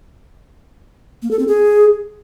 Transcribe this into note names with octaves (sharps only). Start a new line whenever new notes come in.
A#3
A4
C4
G#4